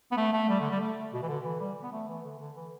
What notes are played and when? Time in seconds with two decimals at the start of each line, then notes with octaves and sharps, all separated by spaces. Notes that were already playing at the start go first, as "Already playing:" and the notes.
0.12 B3
0.17 A3
0.33 A3
0.49 G3
0.60 D3
0.70 G3
0.81 A3
1.13 B2
1.22 E3
1.28 D3
1.44 E3
1.60 G3
1.83 B3
1.92 A3
2.08 E3
2.24 D3
2.40 D3
2.56 E3